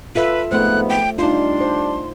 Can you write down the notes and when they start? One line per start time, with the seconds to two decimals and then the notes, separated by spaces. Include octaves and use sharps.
0.15 F4 A4 B4 E5
0.52 F2 G#2 A3 B3 C5 F#6
0.90 G5
1.19 G3 D4 D#4 F4 C6
1.61 C5